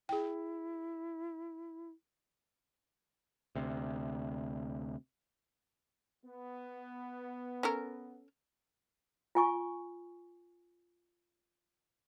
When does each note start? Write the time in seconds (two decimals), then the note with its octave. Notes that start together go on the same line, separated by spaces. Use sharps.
0.09 E4 G#4 G5
3.56 D2 C3
6.25 B3
7.63 C#4 A4 A#4
9.35 F4 G#5 C#6